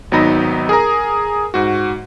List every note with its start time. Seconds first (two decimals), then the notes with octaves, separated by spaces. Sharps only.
0.12 G#1 F#3 B3 D#4 B5 A#6
0.69 G#4 A#4 A#5
1.54 G#2 F#4